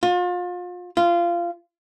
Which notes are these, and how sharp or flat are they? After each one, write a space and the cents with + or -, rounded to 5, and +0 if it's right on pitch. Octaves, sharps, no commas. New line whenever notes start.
F4 +35
F4 -20